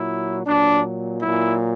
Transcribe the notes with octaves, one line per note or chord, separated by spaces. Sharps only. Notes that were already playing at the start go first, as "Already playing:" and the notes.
Already playing: A#2 F#3 E4
A#2 F#3 D4
A#2 F#3 E4